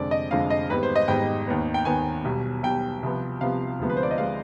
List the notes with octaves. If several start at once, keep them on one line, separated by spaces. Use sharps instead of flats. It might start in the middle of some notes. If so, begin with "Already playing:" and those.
Already playing: F1 F2 D3 G#3 D5
D#5
F1 F2 D3 G#3 F5
D#5
G#1 G#2 G3 B3 B4
C5
D#5
G#1 G#2 G3 B3 G5
D#2 D#3 B3
G5
D#2 D#3 B3 G#5
B1 B2 G3
B1 B2 G3 G5
C2 C3 F3 B3
C2 C3 F3 B3 F5
D2 C3 F3 G#3 B3
B4
C5
D5
D#5
C3 F3 G#3 B3 F5